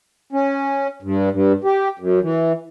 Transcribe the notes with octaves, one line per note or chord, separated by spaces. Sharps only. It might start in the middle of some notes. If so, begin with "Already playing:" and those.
C#4
G2
G2
G4
F#2
E3